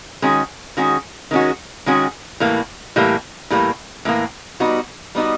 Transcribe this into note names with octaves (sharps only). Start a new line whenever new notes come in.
D#3 G#3 C#4 F#4
D#3 G#3 C#4 F#4
D#3 G#3 C#4 F#4
D#3 G#3 C#4 F#4
A2 E3 G3 A#3
A2 E3 G3 A#3
A2 E3 G3 A#3
A2 E3 G3 A#3
G3 B3 D#4 F#4
G3 B3 D#4 F#4